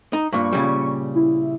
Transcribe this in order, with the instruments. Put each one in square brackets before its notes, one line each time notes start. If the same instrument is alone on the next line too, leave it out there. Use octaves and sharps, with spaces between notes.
[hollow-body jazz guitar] D#4
[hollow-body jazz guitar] G2 A#2 [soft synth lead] C#6
[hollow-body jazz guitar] A#2 C#3 G3
[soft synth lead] E4